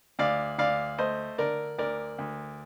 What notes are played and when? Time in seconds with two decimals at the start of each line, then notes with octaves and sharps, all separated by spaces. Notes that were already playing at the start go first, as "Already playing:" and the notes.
0.19 D2 D5 F5
0.58 D2 D5 F5
0.98 A3 C5 D#5
1.38 D3 A#4 D5
1.78 D2 A#4 D5
2.19 D2